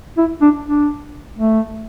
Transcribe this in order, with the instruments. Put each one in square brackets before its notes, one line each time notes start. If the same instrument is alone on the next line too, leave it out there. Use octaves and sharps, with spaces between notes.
[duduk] E4
D4
D4
A3